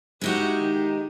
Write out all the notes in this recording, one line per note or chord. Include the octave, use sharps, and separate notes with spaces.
G#3 D#4 E4 F#4 G4
D#3